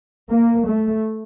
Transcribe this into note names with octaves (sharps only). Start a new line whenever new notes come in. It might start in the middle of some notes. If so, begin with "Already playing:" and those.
A#3
A3